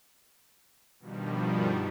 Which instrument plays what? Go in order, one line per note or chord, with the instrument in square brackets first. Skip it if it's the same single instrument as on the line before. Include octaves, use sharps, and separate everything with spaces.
[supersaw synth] G2 B2 D#3 F3 G3